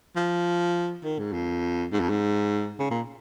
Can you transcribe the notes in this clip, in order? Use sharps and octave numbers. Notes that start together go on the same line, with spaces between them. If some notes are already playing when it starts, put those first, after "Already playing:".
F3
D#3
G#2
F2
G#2
F2
G#2
C#3
A#2